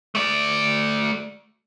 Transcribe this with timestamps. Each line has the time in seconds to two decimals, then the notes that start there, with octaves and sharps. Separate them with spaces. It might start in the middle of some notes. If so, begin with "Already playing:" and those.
0.15 A3 D5